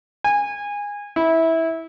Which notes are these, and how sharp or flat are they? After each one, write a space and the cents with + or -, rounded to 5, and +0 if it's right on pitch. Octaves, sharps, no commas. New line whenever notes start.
G#5 -20
E4 -15